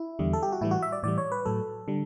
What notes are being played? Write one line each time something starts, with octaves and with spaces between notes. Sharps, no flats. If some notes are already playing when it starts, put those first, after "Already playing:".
Already playing: E4
E2 D3 G3
A4
G4
F#4
A2 E3 G3 E4
F#4
E5
D5
A2 E3 G3 D5
C#5
B4
A2 F#3 A4
D3 G3